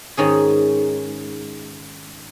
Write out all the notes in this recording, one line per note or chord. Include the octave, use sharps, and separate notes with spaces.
G#2 D#3 C#4 G#4